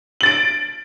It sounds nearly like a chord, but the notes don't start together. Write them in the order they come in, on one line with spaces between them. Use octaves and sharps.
F#7 A6 D7